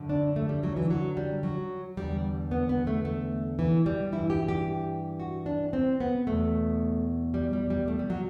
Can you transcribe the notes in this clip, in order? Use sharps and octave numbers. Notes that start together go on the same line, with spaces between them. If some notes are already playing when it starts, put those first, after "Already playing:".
Already playing: F#2 D3
D4
A3
G3
F#3
E3
F#3
G3
F#3
E2 D3 G3
B3
B3
A3
A3
E3
G3
G2 E3 E4
G4
G4
F#4
D4
C4
B3
E2 B2 A3
G3
G3
G3
A3
G3
F#3